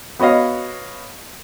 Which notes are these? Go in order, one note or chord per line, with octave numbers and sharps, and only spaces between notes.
B3 F#4 C#5 D#5 F5